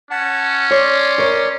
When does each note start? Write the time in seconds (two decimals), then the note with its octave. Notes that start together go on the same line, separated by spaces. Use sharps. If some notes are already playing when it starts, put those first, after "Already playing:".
0.11 C#4 F#5 A5
0.71 C#5 D5 C6
1.19 A#4 C#5